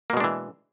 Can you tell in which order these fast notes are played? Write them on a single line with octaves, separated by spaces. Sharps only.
A#3 B2 G#3 D4 E3